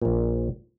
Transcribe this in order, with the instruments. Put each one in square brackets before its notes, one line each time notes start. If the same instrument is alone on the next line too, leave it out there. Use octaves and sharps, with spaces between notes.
[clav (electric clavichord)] A#1 A#2